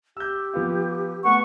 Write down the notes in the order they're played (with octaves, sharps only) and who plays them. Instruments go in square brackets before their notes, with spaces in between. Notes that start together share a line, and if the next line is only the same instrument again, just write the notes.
[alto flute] G4 [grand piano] E6 G6
[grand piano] F3 B3 F4
[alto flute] A3 [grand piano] B3 [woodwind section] F#5 C#6